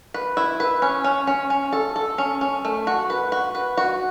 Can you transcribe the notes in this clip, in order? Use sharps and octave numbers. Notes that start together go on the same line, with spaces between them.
B4
E4
B4
C#4
C#4
C#4
C#4
A4
A4
C#4
C#4
A3
F#4
B4
F#4
B4
F#4